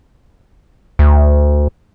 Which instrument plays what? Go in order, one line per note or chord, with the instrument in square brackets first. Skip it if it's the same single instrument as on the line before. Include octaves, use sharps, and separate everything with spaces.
[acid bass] D2